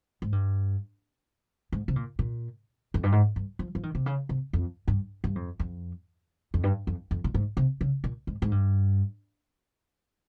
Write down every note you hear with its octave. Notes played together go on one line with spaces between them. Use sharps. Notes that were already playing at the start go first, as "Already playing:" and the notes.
G#2
G2
G#2
C3
A#2
A#2
F2
G2
G#2
G2
F3
F3
D#3
C3
C#3
C3
F2
G2
G2
F2
F2
F2
G2
F2
F2
A#2
G#2
C3
C#3
A#2
G#2
G#2
G2